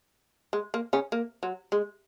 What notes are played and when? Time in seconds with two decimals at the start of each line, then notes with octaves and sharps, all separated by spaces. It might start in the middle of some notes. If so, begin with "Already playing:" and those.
0.53 G#3
0.74 A#3
0.93 C#3 C#4
1.12 A#3
1.43 F#3
1.72 G#3